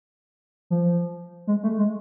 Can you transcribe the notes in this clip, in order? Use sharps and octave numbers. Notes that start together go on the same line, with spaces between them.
F3
G#3
A3
G#3